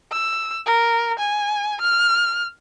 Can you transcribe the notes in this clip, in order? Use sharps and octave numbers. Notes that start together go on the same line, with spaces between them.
E6
A#4
G#5
F6